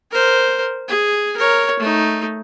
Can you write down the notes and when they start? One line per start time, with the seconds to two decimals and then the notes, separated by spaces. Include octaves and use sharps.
0.11 A#4 C5
0.88 G#4
1.37 A#4 C#5
1.80 A3 D#4